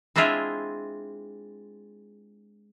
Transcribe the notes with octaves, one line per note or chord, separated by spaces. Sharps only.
G#3 C4 D4 E4 F4 G#4